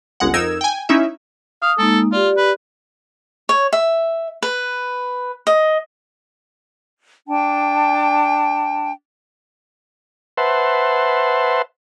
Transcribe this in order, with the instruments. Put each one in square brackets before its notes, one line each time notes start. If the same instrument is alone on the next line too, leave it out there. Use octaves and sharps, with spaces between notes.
[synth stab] G1 C#2 G#3 F#5
F2 D#4 A#4 E6 G#6 E7
G5 G#5
C#4 D#4 E4 E5
[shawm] F5 [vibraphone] D#6
[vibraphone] G#3 A#3 D#4 [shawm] A4
[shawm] F4 [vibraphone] G4 D5
[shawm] B4
[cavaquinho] C#5
E5
B4
D#5
[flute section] D4 G5 A5
[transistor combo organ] B4 C5 E5 F#5 A5 C6